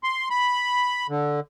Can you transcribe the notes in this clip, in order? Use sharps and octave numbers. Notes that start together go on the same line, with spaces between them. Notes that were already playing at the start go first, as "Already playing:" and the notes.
C6
B5
D3